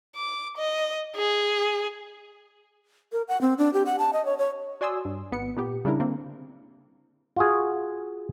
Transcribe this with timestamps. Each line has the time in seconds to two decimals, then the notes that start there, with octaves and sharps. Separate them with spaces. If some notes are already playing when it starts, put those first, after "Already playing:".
0.16 D6
0.57 D#5
1.16 G#4
3.12 A#4
3.28 F#5
3.41 C4
3.58 D4
3.73 G4
3.86 F#5
3.99 A5
4.13 D#5
4.25 C#5
4.38 C#5
4.81 F#4 D5 G#5 C6 D#6 E6
5.05 G2
5.31 G#1 B3 C#7
5.57 A#2 B3 G4
5.85 C#3 G3 D4 E4 A#4
6.00 D3 A#3 C4
7.36 F4 F#4 G#4